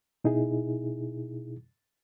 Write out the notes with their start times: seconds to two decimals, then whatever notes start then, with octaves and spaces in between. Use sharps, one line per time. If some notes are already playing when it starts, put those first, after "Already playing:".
0.24 B2 D#4 E4 G#4